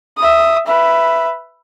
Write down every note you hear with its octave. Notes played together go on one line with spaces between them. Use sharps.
E5 D#6
B4 E5